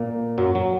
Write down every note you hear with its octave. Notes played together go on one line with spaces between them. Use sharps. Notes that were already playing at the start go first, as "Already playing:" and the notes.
Already playing: A#2 A#3
F#2 F#3
F#3